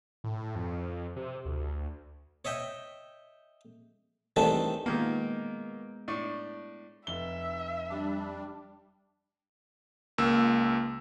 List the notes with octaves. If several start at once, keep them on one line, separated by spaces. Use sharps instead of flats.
A2
F2
C3
D2
C#5 D#5 E5 G5
D#3 E3 G3 A3 C4 D4
A#2 D#3 G#3 A#3 B3
A2 D4
F1 E5 G7
G3 D4
C#2 A#3 E6